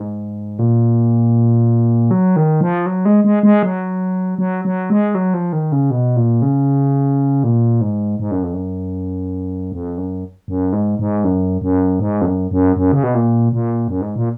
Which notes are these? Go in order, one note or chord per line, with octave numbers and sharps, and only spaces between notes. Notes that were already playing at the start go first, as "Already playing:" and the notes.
Already playing: G#2
A#2
F#3
D#3
F3
F#3
G#3
G#3
G#3
F#3
F#3
F#3
G#3
F#3
F3
D#3
C#3
B2
A#2
C#3
A#2
G#2
G#2
F#2
F2
F#2
F2
F#2
F#2
G#2
G#2
F#2
F#2
G#2
F2
F#2
F#2
F#2
C#3
B2
A#2
A#2
F#2
G#2
A#2